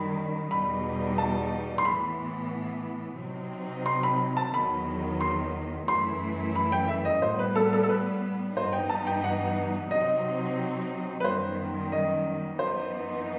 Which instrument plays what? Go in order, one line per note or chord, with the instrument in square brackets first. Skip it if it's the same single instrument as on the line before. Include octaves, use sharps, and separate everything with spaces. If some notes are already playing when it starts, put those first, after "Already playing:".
Already playing: [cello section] F#2 D#3 G3 [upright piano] B5
[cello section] E2 B2 G3 D#4 [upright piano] B5
[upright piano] A5
C6
[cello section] A2 E3 B3 [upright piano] B5
[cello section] C3 F#3 C4 D#4
[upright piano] C6
B5
A5
[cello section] E2 D#3 F#3 B3 D#4 [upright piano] B5
[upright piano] C6
[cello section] F#2 E3 A3 E4 [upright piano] C6
[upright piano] B5
G5
E5
D#5
[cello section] A2 G3 B3 [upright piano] C5
[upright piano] B4
A4
A4
A4
B4
[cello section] G2 E3 B3 D#4 [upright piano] C5
[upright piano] G5
A5
G5
F#5
[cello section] C3 F#3 C4 D#4 [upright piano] D#5
[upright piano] B4
[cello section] F#2 D#3 G3 B3 [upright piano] C5
[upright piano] D#5
[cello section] F#2 E3 B3 D#4 [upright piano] C5